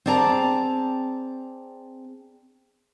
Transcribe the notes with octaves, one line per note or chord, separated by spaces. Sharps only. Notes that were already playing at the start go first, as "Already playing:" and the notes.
C4 G#4 D5 A5 A#5